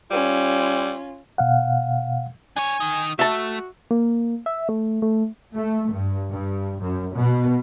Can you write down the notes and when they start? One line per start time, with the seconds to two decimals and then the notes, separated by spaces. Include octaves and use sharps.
0.11 G3 C#4 F4
1.38 B2 F5 F#5
2.56 D4 C#5 G#5
2.80 D#3 D#4
3.19 A3 F#4 E5 A5
3.91 A#3
4.46 E5
4.69 A3
5.02 A3
5.55 A3
5.91 G2
6.31 G2
6.81 F#2
7.14 B2